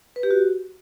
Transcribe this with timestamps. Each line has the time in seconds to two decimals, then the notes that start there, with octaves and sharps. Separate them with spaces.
0.16 B4
0.23 G4
0.31 F#4